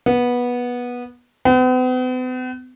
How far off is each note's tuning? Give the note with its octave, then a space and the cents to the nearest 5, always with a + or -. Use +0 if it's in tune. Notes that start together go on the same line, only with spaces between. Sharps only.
B3 -15
B3 +45